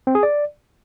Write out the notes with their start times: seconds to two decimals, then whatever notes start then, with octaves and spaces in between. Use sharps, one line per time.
0.07 C4
0.15 G#4
0.23 D5